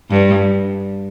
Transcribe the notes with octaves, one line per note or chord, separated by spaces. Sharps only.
G2